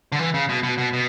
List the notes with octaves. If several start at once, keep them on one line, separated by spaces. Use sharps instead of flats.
D3
E3
C#3
B2
B2
B2
B2